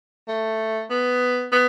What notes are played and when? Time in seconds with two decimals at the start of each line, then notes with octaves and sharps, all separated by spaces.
0.28 A3
0.90 B3
1.52 B3